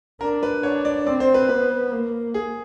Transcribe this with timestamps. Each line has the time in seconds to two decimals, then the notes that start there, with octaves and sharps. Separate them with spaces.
0.21 D4 A#4
0.43 B4
0.63 D4 C#5
0.85 D5
1.07 C4 D5
1.20 C5
1.34 B4
1.49 B3 B4
1.91 A#3
2.34 G#4